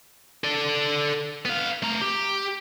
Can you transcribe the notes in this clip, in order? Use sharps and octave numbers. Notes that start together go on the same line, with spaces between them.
A4 D5
B3 F5
A3 A#5
G4